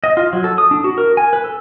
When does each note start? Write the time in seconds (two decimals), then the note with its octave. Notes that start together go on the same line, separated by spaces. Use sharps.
0.04 D#5
0.17 F4
0.33 F#3
0.44 A4
0.58 D#6
0.71 D4
0.84 F#4
0.98 A#4
1.17 G#5
1.33 B4
1.44 A4